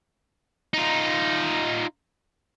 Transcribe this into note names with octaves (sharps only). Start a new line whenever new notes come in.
D#4 F4